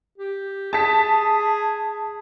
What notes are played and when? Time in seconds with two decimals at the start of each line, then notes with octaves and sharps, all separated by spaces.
0.18 G4
0.73 G#4 A5 B6